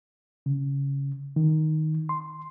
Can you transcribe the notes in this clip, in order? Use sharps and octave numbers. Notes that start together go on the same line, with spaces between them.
C#3
D#3
C6